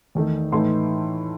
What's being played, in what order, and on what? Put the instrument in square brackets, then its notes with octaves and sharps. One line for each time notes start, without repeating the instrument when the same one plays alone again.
[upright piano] E2 D#3 A3 D#4
A2 E3 A3 D#4 C6